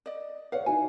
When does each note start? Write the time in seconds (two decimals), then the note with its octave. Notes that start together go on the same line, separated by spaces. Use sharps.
0.06 D5 D#5
0.52 B4 C#5 D5 F5 F#5
0.66 D#4 E4 F#4 G#5